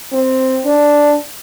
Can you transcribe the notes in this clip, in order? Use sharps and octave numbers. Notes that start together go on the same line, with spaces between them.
C4
D4